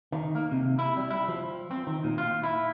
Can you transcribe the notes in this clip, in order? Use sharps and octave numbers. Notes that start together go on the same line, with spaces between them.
D#3
A#3
C3
E4
G3
E4
F3
C4
D#3
A#2
F4
E4